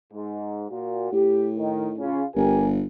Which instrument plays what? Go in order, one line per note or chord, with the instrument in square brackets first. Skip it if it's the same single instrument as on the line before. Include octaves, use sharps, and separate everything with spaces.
[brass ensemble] G#2
A#2 F#4
[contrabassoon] A2 [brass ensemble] G4
[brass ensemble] D#3
C#3 C#4 F4
[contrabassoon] G1 [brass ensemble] G4 A#4 G#5